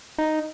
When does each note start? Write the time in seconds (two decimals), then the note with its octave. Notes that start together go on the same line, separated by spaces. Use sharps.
0.18 D#4